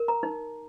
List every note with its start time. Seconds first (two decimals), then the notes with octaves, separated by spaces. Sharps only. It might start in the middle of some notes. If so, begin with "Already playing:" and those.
Already playing: A#4
0.08 A#5
0.23 D#4